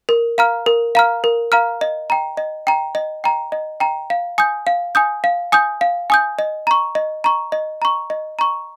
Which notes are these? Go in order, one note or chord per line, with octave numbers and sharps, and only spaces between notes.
A#4
F5 A#5 F6
A#4
F5 A#5 F6
A#4
F5 A#5 F6
D#5
G5 A#5
D#5
G5 A#5
D#5
G5 A#5
D#5
G5 A#5
F5
G#5 D#6 G6
F5
G#5 D#6 G6
F5
G#5 D#6 G6
F5
G#5 D#6 G6
D#5
A#5 C#6
D#5
A#5 C#6
D#5
A#5 C#6
D#5
A#5 C#6